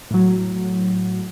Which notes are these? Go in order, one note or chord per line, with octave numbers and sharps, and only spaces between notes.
A2 F#3